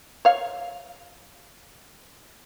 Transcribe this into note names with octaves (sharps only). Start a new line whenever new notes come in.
C#5 F5